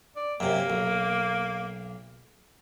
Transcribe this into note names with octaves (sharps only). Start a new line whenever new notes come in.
D5
F#2 C3 A#3
B1